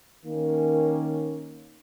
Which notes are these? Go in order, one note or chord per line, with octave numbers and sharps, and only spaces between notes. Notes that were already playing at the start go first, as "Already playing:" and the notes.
D#3 A#3 C#4